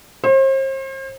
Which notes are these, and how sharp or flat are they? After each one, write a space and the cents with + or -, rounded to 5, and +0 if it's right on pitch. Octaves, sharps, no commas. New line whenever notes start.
C5 +40